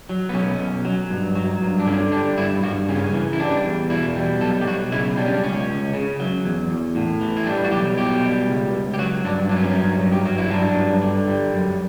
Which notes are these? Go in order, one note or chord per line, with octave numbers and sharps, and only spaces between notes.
F#3
B3
B1 C#4
B1
F#3
G2
F#3
G2
D4
D3 C#4
G3 D4
G2 E4
G2 F#4
C#3 C#4
B3
C#4
E3
E4
G3 D4
E2
B2 E4
G3
B1 A4
G4
B1 F#4
C#3 E4
G3 D4
C#4
D4
C#2 C#4
C#2
C#3
F#3
E2
E2
A2
E3
E4
G3 D4
F#4
B1 G4
B2 G4
G3
C#2
C#2
G4
F#3 F#4
G2 D4
F#3 D4
C#4
B3
C#4
G2
F#3
G4
G2 F#4
E4
F#3 D4
G2
D3
G3
F#2